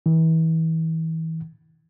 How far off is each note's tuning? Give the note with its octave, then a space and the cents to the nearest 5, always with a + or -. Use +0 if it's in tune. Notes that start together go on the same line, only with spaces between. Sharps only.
E3 -35